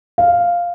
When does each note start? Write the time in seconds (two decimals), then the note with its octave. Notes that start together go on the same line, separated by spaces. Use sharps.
0.18 F5